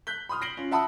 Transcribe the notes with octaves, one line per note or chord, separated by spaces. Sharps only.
F#6 G6 B6 G7
B5 C6 D#6 F6
A#6 C7 D7 F#7 G7
C#4 F4
E5 F#5 A5 B5 D#6 E6